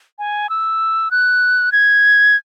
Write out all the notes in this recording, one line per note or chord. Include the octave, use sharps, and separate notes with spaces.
G#5
E6
F#6
G#6